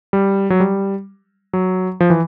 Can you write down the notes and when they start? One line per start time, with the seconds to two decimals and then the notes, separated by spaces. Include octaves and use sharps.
0.13 G3
0.50 F#3
0.60 G3
1.53 F#3
2.00 F3
2.10 E3